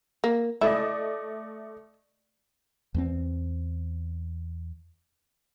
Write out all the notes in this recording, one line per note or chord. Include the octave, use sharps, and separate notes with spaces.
A#3
A3 E4 D5 D#5
E2 A3 C4